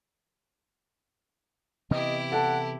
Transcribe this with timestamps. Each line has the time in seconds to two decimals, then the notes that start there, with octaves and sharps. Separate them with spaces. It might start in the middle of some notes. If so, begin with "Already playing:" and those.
1.91 C3 E3 B3 E4 G4 D#5
2.32 A4 F#5 A5